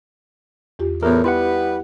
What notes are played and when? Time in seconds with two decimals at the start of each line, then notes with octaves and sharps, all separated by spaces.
0.79 E2 F4 G4
1.03 E2 A2 B3 F4 A#4
1.24 G3 B3 E4 G4 B4 F#5 B5 C6